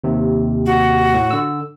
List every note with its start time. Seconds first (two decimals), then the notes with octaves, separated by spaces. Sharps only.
0.04 D#2 C3
0.66 F#4
1.14 A2
1.31 D3 E6